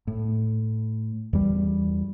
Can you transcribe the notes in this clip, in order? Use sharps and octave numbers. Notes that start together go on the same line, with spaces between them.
A2
E2 G3